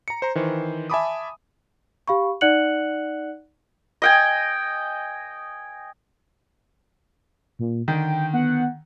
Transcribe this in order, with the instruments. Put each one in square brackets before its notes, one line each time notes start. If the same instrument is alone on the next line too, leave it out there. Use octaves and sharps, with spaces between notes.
[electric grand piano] A#5 C#7
C5 A#5
D#3 E3 C5
E5 G#5 A5 B5 D6 D#6
[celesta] G4 F5 B5 C#6
D#4 D5 F#5 F#6 C#7 F#7
[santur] D#5 G5 G#5
[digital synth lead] A#2
[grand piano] D3 D#3 [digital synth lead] G5
[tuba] B3 [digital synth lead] F#5